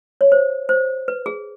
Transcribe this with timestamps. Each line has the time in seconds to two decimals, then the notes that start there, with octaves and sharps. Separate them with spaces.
0.21 C#5
0.32 C5
0.69 C5
1.08 B4
1.26 G#4